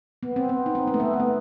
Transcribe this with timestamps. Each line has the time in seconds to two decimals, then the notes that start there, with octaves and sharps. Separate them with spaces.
0.23 B3
0.36 C4
0.49 B3
0.66 D#4
0.75 C4
0.87 B3
0.94 A3
1.00 B3
1.13 A3
1.20 B3